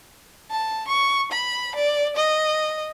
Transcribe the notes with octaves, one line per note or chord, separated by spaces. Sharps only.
A5
C#6
B5
D5
D#5